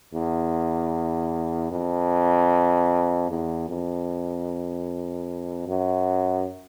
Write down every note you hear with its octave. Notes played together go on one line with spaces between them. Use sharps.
E2
F2
E2
F2
F#2